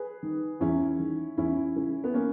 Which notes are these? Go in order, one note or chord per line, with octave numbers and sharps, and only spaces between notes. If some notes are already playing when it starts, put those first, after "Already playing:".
Already playing: G#4 B4
D#3
E2 C#4 E4
D#3
E2 C#4 E4
C#3 E3
B3
A#3 C#4